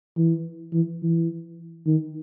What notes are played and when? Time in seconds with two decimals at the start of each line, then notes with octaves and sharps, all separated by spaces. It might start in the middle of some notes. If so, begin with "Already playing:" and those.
0.17 E3
0.73 E3
1.02 E3
1.87 D#3